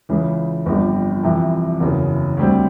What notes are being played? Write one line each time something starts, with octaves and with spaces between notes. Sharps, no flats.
C#2 C#3 E3 G#3
G1 F2 D3 G3
F2 C3 E3
F#1 E2 C#3
D2 D3 G3 C4